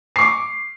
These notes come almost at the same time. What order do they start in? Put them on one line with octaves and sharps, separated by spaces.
C7 C#6 D6